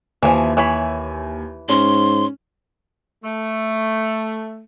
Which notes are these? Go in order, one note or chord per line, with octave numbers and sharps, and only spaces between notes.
D#2 E3 F3 E5 G#5
E3 C#5 B5
G#2 C#4 C6
A3